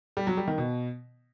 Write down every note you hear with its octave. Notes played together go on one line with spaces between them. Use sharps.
G3
F#3
G3
D#3
B2